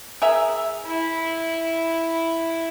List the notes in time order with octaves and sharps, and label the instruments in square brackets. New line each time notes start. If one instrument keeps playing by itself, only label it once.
[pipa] G#4 A#4 E5
[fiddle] E4